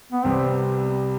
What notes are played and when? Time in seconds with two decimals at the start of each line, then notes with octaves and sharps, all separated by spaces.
0.12 B3
0.24 C2 C3 G3 B3 C4